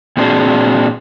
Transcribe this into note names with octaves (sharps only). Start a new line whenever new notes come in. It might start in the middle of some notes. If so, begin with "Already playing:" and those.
A#2 A3 C4 D4 F#4 G#4